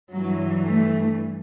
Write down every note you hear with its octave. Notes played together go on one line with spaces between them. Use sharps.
G2 E3 F#3
A3